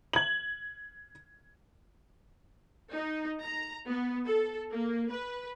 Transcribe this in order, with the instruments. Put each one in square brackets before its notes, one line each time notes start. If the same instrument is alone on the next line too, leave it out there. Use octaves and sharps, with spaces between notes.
[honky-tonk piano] G#6 F#7
[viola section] D#4
A#5
B3
A4
A#3
B4